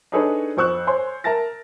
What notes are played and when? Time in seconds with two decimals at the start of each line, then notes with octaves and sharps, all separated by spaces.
0.12 D4 D#4 G#4 A4 B4 C#5
0.57 F2 C5 C#6 E6 F#6
0.87 C5 C#5 G#5 C6
1.24 A#4 E5 A5 A6 A#6